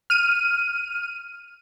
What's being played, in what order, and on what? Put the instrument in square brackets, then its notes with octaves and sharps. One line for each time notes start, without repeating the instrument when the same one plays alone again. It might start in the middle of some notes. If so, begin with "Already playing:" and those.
[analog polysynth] F6 D#7